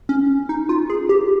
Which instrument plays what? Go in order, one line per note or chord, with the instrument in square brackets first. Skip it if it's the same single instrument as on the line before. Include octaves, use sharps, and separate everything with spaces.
[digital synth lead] C#4
D#4
F4
G#4
G4